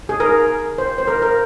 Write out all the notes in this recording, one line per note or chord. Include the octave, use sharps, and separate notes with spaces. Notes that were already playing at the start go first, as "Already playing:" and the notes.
G#4
A#4
C5
C5
A#4
A#4